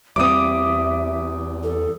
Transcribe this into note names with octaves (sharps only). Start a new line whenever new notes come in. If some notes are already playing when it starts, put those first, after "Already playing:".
E2 G3 A#3 C4 E5 D6 D#6
A4